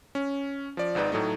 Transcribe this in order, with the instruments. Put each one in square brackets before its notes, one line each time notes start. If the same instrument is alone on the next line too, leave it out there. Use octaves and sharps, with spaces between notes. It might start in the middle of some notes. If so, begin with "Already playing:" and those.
[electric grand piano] C#4
F3 D5
G#1 G#2 D#4 B4 D5
A2 F#3 A3 D#4